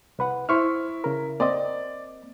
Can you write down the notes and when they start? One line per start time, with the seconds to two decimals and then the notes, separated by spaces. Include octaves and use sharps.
0.19 C2 B4 F#5
0.49 E4 C5 C#6 F6
1.04 C#3 A#4
1.40 A#3 C4 D5 D#5